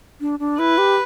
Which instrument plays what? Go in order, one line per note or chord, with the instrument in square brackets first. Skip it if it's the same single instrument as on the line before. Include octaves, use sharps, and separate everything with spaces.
[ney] D4
D4
[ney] E4 [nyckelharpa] B4
[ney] G4